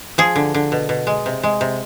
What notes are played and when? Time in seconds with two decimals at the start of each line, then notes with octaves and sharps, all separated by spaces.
0.18 F3 G#4
0.36 D3
0.54 D3
0.72 B2
0.89 B2
1.07 G#3
1.26 C3
1.43 G#3
1.61 C3